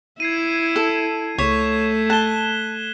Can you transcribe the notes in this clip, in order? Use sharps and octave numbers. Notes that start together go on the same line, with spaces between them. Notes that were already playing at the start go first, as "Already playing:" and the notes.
E4 G#6 C7 D#7
A4
C#2 A3 C#5 G#6 B6 E7
A5 F#6 E7 G7